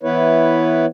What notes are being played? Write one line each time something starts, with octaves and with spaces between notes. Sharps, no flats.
E3 B3 E4 B4 C#5